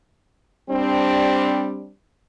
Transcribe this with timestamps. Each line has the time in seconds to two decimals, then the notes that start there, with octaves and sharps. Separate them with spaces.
0.70 G3 C4 D4